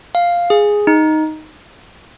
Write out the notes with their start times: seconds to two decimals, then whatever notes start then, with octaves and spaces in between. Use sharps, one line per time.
0.15 F5
0.50 G#4
0.87 D#4